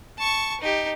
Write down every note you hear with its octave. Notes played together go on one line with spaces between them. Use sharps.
A5 C#6
D#4 G4